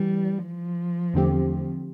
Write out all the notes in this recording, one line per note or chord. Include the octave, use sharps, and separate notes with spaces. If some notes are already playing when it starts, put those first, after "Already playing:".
Already playing: E3 G3
F3
E2 D3 A3 C4 G4